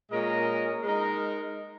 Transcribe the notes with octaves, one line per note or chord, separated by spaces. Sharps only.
A#2 G#3 C#4 A#4 D#5
G#3 D#4 A#4